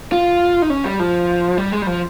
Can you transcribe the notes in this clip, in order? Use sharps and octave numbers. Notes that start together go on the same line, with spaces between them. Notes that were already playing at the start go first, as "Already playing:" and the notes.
F4
D#4
C#4
G3
F3
G3
G#3
G3
F3